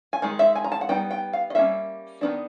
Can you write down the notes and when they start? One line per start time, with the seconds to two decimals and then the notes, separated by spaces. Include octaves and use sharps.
0.13 G#5
0.22 D#3 G#3
0.39 E5
0.55 G#5
0.64 A#5
0.72 A5
0.81 F#5
0.89 G3 B3 D#4 G5
1.11 G5
1.33 F5
1.50 D#5
1.55 G3 A#3 C#4 E5
2.21 D#3 F#3 B3 D4